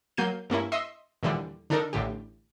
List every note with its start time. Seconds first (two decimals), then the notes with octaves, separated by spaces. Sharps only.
0.17 F#3 A#3 G6 C7 D#7
0.50 G2 A#3 C#4 E4
0.72 D#5 E5 C6 E6
1.23 D#2 A#2 D3 E3 G3
1.70 D3 D4 D#4 A4 A#4
1.93 A1 A2 D3 G4